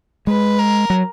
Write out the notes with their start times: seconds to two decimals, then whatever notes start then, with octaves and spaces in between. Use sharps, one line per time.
0.27 G#3 B4
0.59 A#4
0.90 F#3